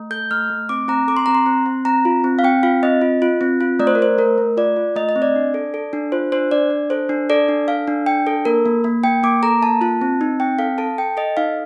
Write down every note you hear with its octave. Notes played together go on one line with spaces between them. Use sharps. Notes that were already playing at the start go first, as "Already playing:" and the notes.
Already playing: A3
A4 G6
A3 F6
A3
C4 D6
C4 A#5
A4 D6
C6
C4 A#5
C6
C4
C4
C4 A#5
F4
C4
F5
C4 G5
F4 F5
C4 D#5
F4
F4
C4
F4
A3 D5
C5
A#4
A3 C5
A3 A#4
A3
F4 D5
F4
A3 D#5
D#5
C4
D5
D4
A4
A4
D4
F4 C5
D4 C5
D4 D5
D4
A4 C5
D4
A4 D5
D4
A4 F5
D4
D4 G5
A4
A#3 A#4
A#3
A#3
A#3 G5
A#3 D6
A4 A#5
A#3 A5
F4 A5
C4
D#4
C4 G5
A4 F5
A4 A5
A4 G5
A4 D#5
D#4 F5